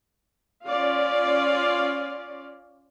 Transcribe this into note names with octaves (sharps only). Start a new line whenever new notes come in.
C#4 F4 D5 F5